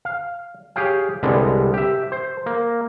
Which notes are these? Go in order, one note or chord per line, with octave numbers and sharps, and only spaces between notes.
F5
G4 G#4 C#5 F5 G5
C2 D3 G3 G#3 B3
G4 E5
C5
A#3